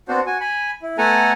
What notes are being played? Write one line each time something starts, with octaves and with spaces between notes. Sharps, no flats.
B3 C4 D4 F#4 C5
F#4 G#5
G#5 B5
E4
A3 B3 A4 F#5 G#5 A#5